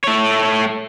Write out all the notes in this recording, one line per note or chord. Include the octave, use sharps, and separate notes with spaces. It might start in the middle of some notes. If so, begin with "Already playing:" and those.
A3 C#5